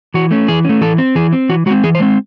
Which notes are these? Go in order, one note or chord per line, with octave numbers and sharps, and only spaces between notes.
E3 F#4
A3 C#4
E3 G#4
A3 C#4
E3 A4
C4
E3 G#4
C4
E3 F#4
G#3 C4 F#4
E3 G#4
C5
G#3 C4